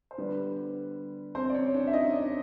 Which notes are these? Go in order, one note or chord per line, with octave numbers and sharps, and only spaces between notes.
C5
D3 G3 B3 B4
C4 C5
D5
C#4 C#5
D4 D5
E5
D#4 D#5
D4 D5